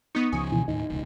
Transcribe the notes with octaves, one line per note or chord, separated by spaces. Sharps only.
B3 D#4 C#6 D#6
C#2 C#3 F3 G#5
B2 E3
D#2 A2 D#4
E1 C#2